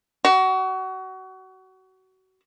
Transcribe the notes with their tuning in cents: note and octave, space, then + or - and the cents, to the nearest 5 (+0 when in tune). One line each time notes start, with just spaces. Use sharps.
F#4 +25